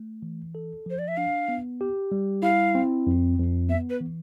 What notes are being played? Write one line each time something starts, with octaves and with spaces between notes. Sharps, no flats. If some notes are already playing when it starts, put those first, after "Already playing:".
Already playing: A3
E3
A4
F3 C5
D5
E5
D4 F5
B3
G4
G3
E4 F5
C4
F2
F2
B3 E5
B4
E3